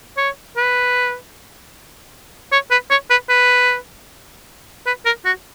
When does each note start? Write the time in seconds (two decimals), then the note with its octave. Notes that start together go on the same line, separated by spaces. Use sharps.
0.17 C#5
0.57 B4
2.52 C#5
2.71 B4
2.90 C#5
3.10 B4
3.29 B4
4.86 B4
5.06 A#4
5.25 F#4